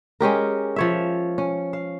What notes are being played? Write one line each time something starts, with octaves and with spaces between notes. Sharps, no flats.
G#3 C#4 G4 A#4
F3 C#5 E5
C#4
F5